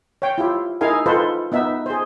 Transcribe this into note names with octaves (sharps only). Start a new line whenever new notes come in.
C#5 G5
E4 F4 G4
D#4 E4 G#4 A#4 F5 G#5
D#4 F4 A4 B4 C5
B3 D#4 E5
G#4 C5